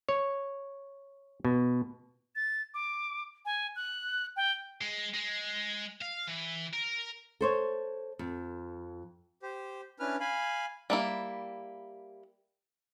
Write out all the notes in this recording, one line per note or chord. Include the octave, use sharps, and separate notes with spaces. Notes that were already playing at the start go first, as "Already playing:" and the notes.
C#5
B2
A6
D6
G#5
F#6
G5
G#3
G#3
F5
E3
A#4
A4 C5 C#5
F2
G4 C5
C#4 D4 E4 B4 F6
F5 G#5 B5
G3 A#3 E4